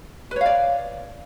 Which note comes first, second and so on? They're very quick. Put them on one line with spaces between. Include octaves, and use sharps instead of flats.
B4 C#5 F5 D5